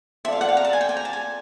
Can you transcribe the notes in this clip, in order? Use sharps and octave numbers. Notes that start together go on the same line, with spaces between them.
C4 F4 A4 D5 E5
F5
F#5
F5
A#5
A5
G#5
G5
G#5
A#5
A5
G#5